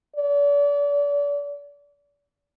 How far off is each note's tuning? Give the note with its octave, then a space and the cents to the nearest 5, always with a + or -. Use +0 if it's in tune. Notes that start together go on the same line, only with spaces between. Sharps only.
D5 -35